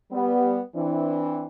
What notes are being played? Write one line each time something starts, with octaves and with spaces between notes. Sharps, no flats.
G3 B3
E3 C4 D4